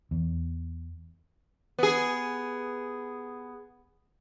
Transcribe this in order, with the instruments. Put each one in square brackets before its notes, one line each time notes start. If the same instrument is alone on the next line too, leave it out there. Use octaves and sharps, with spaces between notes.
[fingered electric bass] E2
[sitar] B3 G#4